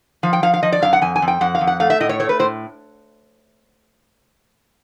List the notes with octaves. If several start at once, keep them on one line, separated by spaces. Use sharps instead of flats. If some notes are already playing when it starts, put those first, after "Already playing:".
F3 F5
G5
F3 F5
F5
F3 D#5
D5
F#2 F5
F#5
F2 G#5
G#5
F2
G5
F2 F#5
F5
F2
F#5
A3 F5
E5
A2 D#5
C#5
A3 C#5
B4
A2 C5